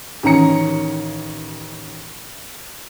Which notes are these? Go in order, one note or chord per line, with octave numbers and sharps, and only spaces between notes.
A1 D#3 C#4 A#5 C#7